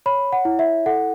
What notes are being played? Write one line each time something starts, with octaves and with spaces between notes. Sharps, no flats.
C#5 B5
F#5
E4
E5
A4 F#5